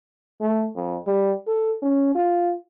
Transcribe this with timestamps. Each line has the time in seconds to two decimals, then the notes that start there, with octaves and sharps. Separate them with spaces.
0.41 A3
0.76 F2
1.07 G3
1.47 A4
1.83 C#4
2.15 F4